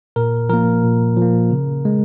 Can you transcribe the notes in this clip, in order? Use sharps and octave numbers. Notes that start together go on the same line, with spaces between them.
A#2 A#4
F3 A#3 A#4
A#2
F3
A#3
C#3
G#3